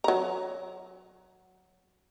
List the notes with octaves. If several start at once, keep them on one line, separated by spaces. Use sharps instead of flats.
F#3 A#5